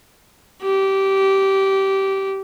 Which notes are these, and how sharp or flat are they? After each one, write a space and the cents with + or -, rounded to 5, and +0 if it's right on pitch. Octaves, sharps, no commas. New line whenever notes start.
G4 -15